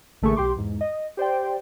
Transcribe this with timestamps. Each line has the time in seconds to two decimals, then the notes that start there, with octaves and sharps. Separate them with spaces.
0.22 A1 D3 A3 A#3 G#4 C#6
0.36 B1 G4 C6 D6
0.56 E2 G#2
0.81 D#5
1.17 G4 C5 D5 G5